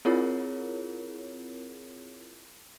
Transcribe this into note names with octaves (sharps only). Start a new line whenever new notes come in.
C4 E4 F4 G#4 A#4 C#5